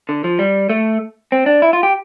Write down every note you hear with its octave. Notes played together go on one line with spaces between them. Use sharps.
D3
F3
G3
A3
C4
D4
E4
F4
G4